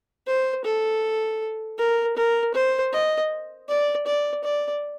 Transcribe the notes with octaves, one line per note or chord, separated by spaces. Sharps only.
C5
A4
A#4
A#4
C5
D#5
D5
D5
D5